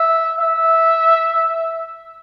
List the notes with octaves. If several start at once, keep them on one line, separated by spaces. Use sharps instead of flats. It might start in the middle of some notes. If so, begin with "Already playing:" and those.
Already playing: E5
E5